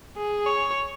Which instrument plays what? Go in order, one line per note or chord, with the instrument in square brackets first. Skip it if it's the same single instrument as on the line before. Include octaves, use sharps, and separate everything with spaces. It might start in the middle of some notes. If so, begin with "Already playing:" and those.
[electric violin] G#4
C#5